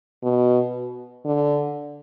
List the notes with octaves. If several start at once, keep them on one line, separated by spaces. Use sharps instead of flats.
B2
D3